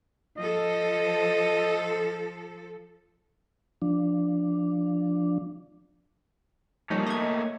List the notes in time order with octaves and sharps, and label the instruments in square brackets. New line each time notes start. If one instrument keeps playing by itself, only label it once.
[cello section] F3 A4 [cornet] D#5
[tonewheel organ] F3 D4
[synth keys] F3 G3 D#4 [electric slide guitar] A3 A#3 C#5
[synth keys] D#5 G#6